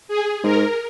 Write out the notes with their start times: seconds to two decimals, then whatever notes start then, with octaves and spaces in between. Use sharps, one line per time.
0.08 G#4
0.43 G#2 A#4